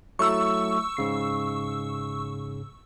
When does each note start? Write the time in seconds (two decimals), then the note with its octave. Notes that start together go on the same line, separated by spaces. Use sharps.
0.19 F#3 A3 E4 C#6 E6
0.97 G#2 C#3 C7